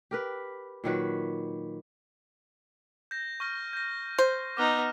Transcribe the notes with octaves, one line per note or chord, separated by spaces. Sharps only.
G4 A#4 B4
A#2 D#3 F#3 B4
G6 A#6
C#6 F6 A#6
G6 A#6
C5
B3 D#4 D6 F6 F#6